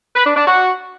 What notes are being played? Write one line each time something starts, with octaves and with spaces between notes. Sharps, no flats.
B4
D4
D4
F#4